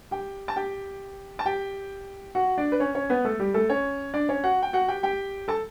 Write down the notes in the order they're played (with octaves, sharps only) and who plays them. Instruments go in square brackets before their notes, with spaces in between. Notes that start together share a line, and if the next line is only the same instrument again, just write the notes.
[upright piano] G4 G5
A5
G4 G5
A5
G4 G5
F#4 F#5
D4 D5
B4
C#4 C#5
C#4 C#5
B3 B4
A3 A4
G3 G4
A3 A4
C#4 C#5
D4 D5
C#4 C#5
F#4 F#5
G5
F#4 F#5
G4 G5
G4 G5
A4 A5